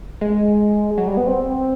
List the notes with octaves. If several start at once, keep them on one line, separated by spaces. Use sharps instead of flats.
G#3
F#3
G3
B3
C4